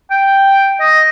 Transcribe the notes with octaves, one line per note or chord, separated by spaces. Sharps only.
G5
D#5